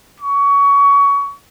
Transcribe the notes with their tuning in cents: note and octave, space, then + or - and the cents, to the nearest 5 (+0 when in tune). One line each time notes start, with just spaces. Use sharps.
C#6 +25